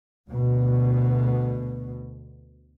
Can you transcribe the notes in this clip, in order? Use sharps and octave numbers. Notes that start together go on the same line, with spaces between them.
D2 B2